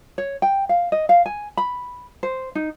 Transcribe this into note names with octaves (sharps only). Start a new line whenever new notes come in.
C#5
G5
F5
D#5
F5
G#5
B5
C5
D#4